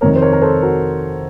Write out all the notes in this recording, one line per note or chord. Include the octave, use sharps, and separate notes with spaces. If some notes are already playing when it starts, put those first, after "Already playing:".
F2 C3 D#3 A#4 C#5
C5
A#4 C#5
A#4
A4 C5
F#4 A#4